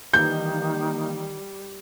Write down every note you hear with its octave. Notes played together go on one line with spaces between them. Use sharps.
D#3 E3 G3 A#3 D#4 G6